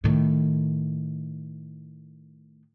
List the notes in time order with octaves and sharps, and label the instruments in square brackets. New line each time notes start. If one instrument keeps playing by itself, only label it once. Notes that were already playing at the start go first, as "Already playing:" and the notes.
[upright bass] A2 D#3